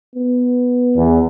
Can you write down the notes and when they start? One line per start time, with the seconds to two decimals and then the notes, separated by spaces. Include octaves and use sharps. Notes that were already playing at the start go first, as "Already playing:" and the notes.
0.16 B3
0.95 E2